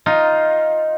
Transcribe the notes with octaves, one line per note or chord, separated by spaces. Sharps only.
D#4 F4